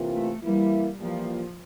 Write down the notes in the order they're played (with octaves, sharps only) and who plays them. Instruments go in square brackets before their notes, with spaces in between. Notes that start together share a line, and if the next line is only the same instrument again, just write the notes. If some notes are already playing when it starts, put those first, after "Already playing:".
Already playing: [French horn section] C3 E3 A#3 F4
[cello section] A3
[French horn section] E3 A#3 E4 [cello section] G3
[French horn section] E3 G3 A#3 F4 [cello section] F3